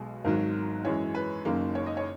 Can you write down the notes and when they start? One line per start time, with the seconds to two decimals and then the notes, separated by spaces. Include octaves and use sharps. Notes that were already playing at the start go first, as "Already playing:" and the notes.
Already playing: B1 B2 G#3
0.24 G#1 G#2 D#3 F#3 A#4
0.85 F#2 E3 G#3 C#5
1.15 B4
1.45 F#1 F#2 D#3 A#3
1.75 C#5
1.86 D#5
1.97 C#5